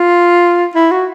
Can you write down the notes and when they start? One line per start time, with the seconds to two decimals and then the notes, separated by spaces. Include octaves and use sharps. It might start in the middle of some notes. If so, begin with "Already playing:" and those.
Already playing: F4
0.75 E4
0.91 F#4